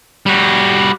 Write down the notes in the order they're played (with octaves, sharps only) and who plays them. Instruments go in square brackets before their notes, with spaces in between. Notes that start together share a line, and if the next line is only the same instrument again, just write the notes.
[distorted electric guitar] G3 F#4